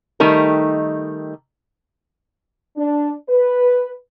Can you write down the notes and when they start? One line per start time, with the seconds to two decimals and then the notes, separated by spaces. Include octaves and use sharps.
0.20 D#3 G3 A3 D#4 G4 A#4
2.77 D4
3.29 B4